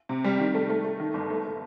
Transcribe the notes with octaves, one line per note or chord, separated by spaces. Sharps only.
C3
G3
D#3
A3
A3
A3
D#3
G1
A3
A3